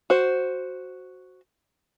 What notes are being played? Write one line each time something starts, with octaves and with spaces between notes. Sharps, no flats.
F#4 C5